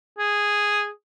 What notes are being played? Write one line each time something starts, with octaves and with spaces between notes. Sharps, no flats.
G#4